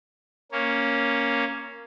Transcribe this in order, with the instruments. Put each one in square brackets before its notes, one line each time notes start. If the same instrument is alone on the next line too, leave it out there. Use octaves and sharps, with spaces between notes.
[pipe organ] A#3 C#4